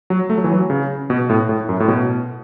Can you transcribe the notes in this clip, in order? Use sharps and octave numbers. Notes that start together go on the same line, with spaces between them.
F#3
A3
F#3
E3
F#3
C#3
B2
A2
A2
F#2
A2
B2